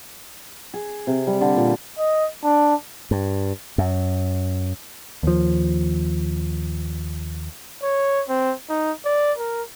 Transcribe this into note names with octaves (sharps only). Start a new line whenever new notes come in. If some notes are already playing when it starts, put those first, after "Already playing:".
G#4
C3
G3
D3
A#2
D#5
D4
G2
F#2
D#2 F3
C#5
C4
D#4
D5
A#4